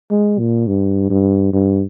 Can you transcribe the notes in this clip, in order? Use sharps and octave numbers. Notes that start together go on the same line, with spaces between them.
G#3
A#2
G2
G2
G2